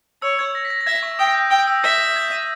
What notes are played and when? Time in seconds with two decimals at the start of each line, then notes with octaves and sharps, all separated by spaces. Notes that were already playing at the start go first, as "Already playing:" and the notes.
0.22 C#5 E6
0.39 G#6
0.55 A#6
0.65 B6
0.70 A#6
0.81 A#6
0.86 E5 G#6
1.03 C#6
1.19 G5 D#6
1.35 G6
1.51 G5 E6
1.60 G6
1.67 E6
1.84 E5
2.16 G#6
2.32 D#7